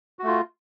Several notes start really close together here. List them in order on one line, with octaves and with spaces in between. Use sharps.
F#4 A3 F4